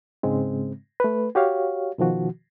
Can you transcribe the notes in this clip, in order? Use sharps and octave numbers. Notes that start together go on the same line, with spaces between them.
G#2 C#3 G#3 C4
A3 B4
F#4 G4 C#5 F5
B2 D#3 F3 F#4